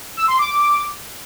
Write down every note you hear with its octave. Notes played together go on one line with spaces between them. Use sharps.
E6
C6
D6